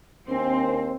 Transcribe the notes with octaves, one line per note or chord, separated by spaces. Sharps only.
D#2 C4 D4 A#4 G#5